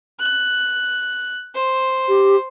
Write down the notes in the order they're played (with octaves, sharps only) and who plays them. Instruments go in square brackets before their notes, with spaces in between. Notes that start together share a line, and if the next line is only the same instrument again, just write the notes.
[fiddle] F#6
C5
[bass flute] G4